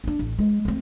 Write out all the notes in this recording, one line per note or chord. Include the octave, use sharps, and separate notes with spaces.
C#4 D4
A1
G#3
A3 C4